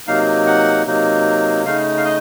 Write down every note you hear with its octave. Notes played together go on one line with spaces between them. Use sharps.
C3 F#3 A#3 D#4 F5
F#5
C3 F#3 A#3 D#4
C#3 A3 D#4 F5
F5
D#5